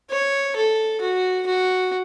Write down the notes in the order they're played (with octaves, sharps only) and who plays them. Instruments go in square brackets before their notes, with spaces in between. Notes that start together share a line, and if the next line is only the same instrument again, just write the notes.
[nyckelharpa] C#5
A4
F#4
F#4